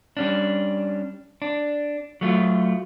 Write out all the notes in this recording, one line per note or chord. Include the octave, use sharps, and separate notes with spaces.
G3 C#4 D4
D4
F#3 A3 F4